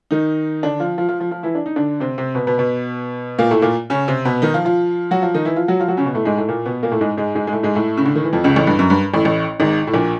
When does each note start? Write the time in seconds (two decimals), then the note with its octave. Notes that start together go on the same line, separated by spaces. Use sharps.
0.11 D#3 D#4
0.63 D3 D4
0.80 F3 F4
0.98 F3 F4
1.09 F3 F4
1.20 F3 F4
1.31 F3 F4
1.43 E3 E4
1.55 D4
1.66 D#4
1.76 D3 D4
2.00 C3 C4
2.18 C3 C4
2.35 B2 B3
2.47 B2 B3
2.58 B2 B3
3.39 A#2 A#3
3.51 A2 A3
3.62 A#2 A#3
3.90 C#3 C#4
4.08 C3 C4
4.25 B2 B3
4.42 D#3 D#4
4.54 F3 F4
4.65 F3 F4
5.11 F#3 F#4
5.22 F3 F4
5.34 D#3 D#4
5.45 E3 E4
5.56 F3 F4
5.68 F#3 F#4
5.79 F3 F4
5.88 F#3 F#4
5.97 C#3 C#4
6.06 B2 B3
6.14 A2 A3
6.25 G#2 G#3
6.37 A2 A3
6.48 A#2 A#3
6.66 B2 B3
6.83 A#2 A#3
6.91 A2 A3
7.01 G#2 G#3
7.17 G#2 G#3
7.35 G#2 G#3
7.47 G#3
7.53 A2 A3
7.63 G#2 G#3
7.75 A2 A3
7.97 C#3
8.05 D3
8.16 D#3
8.24 E3
8.33 F2 F3
8.44 C#2 C#3
8.56 A1 A2
8.67 G2
8.79 F#2
8.90 G2
9.14 A1 A2
9.25 A1 A2
9.60 G#1 G#2
9.87 A2
9.94 A#1 A#2